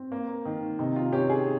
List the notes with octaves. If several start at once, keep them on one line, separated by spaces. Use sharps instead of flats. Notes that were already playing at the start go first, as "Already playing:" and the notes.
Already playing: C4
A#3
D#3
C3 D#4
F4
C#4 G4
G#4